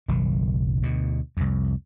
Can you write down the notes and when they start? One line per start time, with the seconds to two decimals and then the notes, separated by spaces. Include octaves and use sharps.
0.08 F#1 B1 D#3
0.83 D2 B2
1.37 C2 F2